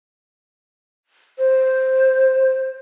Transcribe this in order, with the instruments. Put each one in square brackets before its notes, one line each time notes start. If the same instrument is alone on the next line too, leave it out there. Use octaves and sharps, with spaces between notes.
[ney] C5